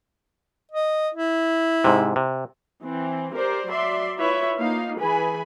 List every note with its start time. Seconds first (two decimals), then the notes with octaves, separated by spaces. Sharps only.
0.71 D#5
1.14 E4
1.84 G#2 C3
2.16 C3
2.83 E3 C4
3.35 G4 A#4 C5 D5
3.68 F#3 D5 E5 C6
4.18 E4 F4 B4 C#5 E5
4.59 A#3 D#4 F4 F5
4.99 E3 G#4 B4 G#5 B5